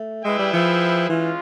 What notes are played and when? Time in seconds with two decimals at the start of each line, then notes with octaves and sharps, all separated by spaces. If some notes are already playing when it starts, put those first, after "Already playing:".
Already playing: A3
0.24 G#3 E4 G#4 B4 E5 G5
0.39 G3
0.53 F3
1.09 E3 G#3 C#4 F4